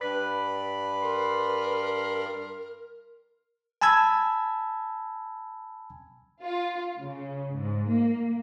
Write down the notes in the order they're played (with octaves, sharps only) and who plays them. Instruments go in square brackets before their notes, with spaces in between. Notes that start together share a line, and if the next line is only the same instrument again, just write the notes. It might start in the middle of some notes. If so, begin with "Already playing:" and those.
[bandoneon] G2 D5 B5 [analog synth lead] B4
[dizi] A#4 [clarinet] C6
[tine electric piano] G#5 A5 B5 E6 G#6
[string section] F4
C#3
G#2
A#3